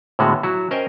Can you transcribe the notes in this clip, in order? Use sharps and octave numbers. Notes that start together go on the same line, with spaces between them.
A2 D3 G#3 B3 F#4
F#3 E4 F#4
C#4 A#4 C5 D#5 G5 G#5